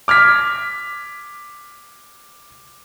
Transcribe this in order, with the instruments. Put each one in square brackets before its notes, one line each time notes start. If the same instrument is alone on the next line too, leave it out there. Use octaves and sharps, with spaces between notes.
[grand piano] D6 F6 G#6 B6